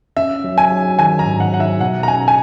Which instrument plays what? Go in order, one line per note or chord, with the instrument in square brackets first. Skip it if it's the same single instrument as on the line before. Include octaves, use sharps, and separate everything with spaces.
[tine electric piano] C#4 [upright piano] E5
[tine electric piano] F#3
[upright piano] G#5
[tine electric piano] F#3
[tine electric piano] D#3 [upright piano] G#5
[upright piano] A#5
[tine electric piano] G#2
[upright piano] F#5
[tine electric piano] F#3 [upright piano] F#5
[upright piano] E5
[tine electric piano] B2 [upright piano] F#5
[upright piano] A#5
[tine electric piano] C#4 [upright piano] G#5
[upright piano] G#5